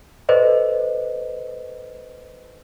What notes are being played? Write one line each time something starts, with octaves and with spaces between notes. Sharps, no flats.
A4 B4 C5 D5 D#5